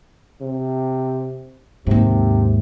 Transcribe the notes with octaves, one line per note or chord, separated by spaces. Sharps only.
C3
D#2 G#2 C3